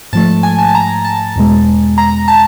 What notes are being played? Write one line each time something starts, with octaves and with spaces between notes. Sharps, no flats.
G#2 F3 A3 A5
G#5
A5
A5
A#5
A5
E2 B2 G#3
A#5
A5